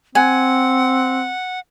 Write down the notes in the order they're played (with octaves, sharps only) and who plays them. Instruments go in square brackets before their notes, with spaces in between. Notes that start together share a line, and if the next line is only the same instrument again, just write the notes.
[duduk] C4 [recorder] F#5 [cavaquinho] G#5